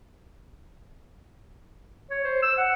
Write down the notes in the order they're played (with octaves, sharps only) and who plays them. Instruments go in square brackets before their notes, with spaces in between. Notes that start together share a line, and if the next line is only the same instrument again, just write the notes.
[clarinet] C#5
C5
E6
F#5